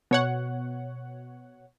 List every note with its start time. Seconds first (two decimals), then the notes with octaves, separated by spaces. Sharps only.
0.11 B2 C#5 F#5